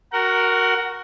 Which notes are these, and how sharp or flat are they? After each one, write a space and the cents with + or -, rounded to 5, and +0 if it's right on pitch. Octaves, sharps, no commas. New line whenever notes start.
F#4 +0 A#4 +0 F#5 +25